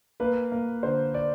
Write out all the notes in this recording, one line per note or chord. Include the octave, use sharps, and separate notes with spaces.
A#3 B4
A#3
D3 C5
D5